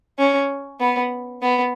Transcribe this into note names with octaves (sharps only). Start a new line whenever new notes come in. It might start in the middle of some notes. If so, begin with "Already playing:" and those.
C#4
B3
B3